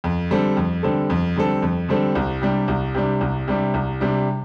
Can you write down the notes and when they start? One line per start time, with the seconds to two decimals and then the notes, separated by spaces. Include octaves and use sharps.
0.04 F2
0.31 D3 G3 C4 A4
0.57 F2
0.83 D3 G3 C4 A4
1.10 F2
1.36 D3 G3 C4 A4
1.62 F2
1.89 D3 G3 C4 A4
2.15 C2
2.42 C3 G3 D4
2.68 C2
2.95 C3 G3 D4
3.21 C2
3.48 C3 G3 D4
3.74 C2
4.01 C3 G3 D4